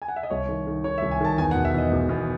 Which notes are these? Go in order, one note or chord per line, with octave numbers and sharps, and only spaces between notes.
G#5
F#5
E5
D#5
C2 C#5
D#3
D#3
D#3 C#5
E5
C2
G#5
D#3 A5
E2 G#5
F#5
E1
E5
E2 D#5
E1
E2